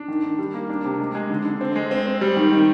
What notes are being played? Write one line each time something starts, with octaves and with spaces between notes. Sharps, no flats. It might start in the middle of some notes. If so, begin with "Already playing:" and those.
Already playing: D4
D#3
D#3
G3
A#3
D4
C3
G#3
G#3
D3
D3
C4
G#3
C4
C4
G3
D#3
D#3